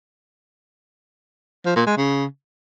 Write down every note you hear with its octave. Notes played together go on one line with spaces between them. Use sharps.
F3
A#2
G#3
C#3